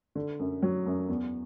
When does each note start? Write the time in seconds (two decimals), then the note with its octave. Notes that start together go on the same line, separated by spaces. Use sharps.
0.15 D3
0.39 F#2
0.62 F#3
0.86 F#2
1.08 E2